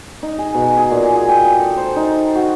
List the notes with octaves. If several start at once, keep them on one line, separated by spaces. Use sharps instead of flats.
D#4
G#4
B2
G#4
A#2
G#4
G5
A#5
A4
C5
D#4
F#4